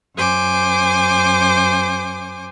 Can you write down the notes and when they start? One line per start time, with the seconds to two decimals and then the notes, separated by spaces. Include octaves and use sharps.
0.16 F#2 C5 G#5 D6